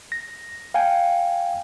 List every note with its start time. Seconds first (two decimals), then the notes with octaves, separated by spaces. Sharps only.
0.12 A#6
0.74 F5 G5 G#5